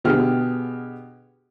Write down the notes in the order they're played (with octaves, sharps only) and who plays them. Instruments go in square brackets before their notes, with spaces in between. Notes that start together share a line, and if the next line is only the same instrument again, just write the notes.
[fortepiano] B2 D3 G4 G#4 F6